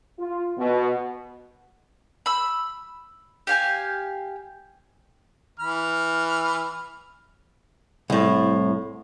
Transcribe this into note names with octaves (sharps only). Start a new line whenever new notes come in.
F4
B2
B5 E6
G4 F5 G#5
E3 B5 F6
C2 A2